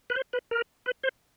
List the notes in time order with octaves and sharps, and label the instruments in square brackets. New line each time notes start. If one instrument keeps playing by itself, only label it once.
[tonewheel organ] B4
C5
B4
A#4
B4
C5